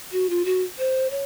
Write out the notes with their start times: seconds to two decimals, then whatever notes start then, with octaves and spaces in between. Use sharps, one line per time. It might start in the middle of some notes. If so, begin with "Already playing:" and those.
0.12 F#4
0.30 F4
0.45 F#4
0.78 C5
1.11 C#5